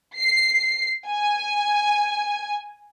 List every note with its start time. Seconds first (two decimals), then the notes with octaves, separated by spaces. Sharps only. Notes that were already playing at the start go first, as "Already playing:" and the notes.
0.17 C7
1.07 G#5